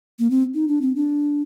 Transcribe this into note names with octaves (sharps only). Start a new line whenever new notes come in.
A#3
C4
D#4
D4
C4
D4